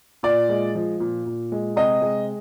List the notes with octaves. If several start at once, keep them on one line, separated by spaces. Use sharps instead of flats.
A#2 D5
G#3
F3
A#2
A#2
G#3
C3 D#5
G#3